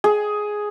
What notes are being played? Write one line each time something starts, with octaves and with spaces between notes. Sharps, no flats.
G#4